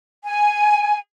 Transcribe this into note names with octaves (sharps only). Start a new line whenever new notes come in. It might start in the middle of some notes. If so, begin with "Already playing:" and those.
G#5